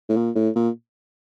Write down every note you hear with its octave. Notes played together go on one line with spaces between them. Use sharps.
A2
A#2
A2
A#2